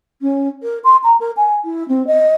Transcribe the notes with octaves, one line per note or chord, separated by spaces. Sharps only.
C#4
A#4
C6
A#5
A#4
G#5
E4
C4
D#5